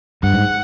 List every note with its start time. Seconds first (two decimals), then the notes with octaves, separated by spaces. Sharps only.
0.23 G2 F#5
0.34 G#2